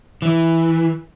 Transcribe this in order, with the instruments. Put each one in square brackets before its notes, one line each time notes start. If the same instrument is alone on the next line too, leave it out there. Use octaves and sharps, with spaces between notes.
[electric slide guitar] E3